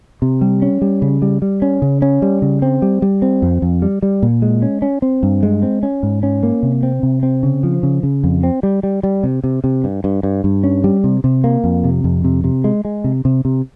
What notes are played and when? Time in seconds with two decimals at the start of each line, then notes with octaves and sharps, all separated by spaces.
0.22 C3
0.41 G3
0.62 C#4
0.82 G3
1.02 C#3
1.22 G3
1.42 G3
1.62 C#4
1.82 C#3
2.02 C#4
2.22 G3
2.42 C#3
2.62 C4
2.82 G3
3.02 G3
3.22 C4
3.42 F2
3.62 F2
3.82 G3
4.03 G3
4.23 A#2
4.42 G#3
4.62 C#4
4.82 C#4
5.02 C4
5.23 G2
5.43 G#3
5.63 C4
5.83 C#4
6.03 G#2
6.23 C#4
6.43 A#3
6.63 C3
6.83 C4
7.03 C3
7.23 C4
7.43 C#3
7.63 F3
7.83 C#3
8.03 C#3
8.24 F2
8.43 C4
8.63 G3
8.83 G3
9.03 G3
9.24 C3
9.44 C3
9.64 C3
9.84 G2
10.04 G2
10.23 G2
10.44 G2
10.64 C#4
10.84 G3
11.04 C3
11.24 C3
11.44 A#3
11.64 F2
11.84 C3
12.04 F2
12.24 C3
12.44 C3
12.64 G#3
12.85 G#3
13.04 C3
13.25 C3
13.45 C3